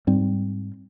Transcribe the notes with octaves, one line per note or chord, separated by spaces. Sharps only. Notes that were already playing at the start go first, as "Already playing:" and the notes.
G#2 G3 C4